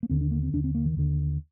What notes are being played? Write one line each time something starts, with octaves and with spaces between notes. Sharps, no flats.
A#3
D#2 D3 C4
D4
A#3
C4
D#2 D3 D4
C4
A#3
D#3
D#2 D3